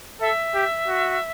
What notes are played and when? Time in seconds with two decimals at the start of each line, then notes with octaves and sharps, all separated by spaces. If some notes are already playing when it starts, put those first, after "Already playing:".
0.21 A4 E5
0.55 G4
0.88 F#4